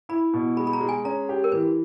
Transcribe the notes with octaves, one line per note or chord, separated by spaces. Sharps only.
E4 B5
B2
G#3 B5
B5
A#5
G#3
G#5
C#4 A#5
G4
A#4
E3 B4